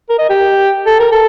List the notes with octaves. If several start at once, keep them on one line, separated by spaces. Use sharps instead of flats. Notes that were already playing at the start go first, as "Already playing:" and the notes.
A#4
D#5
G4
A4
A#4
A4